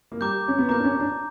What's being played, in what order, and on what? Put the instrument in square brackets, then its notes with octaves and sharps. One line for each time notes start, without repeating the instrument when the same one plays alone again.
[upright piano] A#3
[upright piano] G3 [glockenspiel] A#5 D6 G6
[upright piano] C#4
B3
[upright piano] A#3 [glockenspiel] A#5 D6 G6
[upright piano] D4
C#4
D4